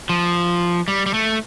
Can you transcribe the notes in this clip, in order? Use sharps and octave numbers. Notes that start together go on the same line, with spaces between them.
F3
G3
G3
A3